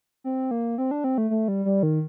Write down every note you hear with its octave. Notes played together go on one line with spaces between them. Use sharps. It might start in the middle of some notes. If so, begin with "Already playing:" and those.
C4
A#3
C4
D4
C4
A3
A3
G3
G3
D#3